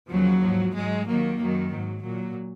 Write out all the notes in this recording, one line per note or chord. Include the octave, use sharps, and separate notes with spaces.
D#2 C#3 F3 F#3
G#2 F3
G#2 F#3 G#3
D#2 D#3 F#3 A#3
F#2 D#3 F#3
G#2 F#3
A#2 F#3